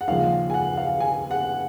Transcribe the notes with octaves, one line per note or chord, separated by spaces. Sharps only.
F#5
D#2 C#3 F3 G#3 F5
G#5
F#5
F5
G#5
F#5